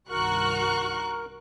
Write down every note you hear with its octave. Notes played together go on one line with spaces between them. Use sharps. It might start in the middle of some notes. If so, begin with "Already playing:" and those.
C2 G2 D#3 F#4 A#4 C#6 F#6